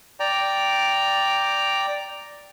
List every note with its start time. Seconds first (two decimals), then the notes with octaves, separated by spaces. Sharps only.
0.20 D5 G5 A#5